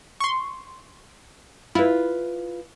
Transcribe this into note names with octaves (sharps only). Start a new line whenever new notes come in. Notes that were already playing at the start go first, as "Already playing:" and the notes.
C6 C#6
E4 F4 B4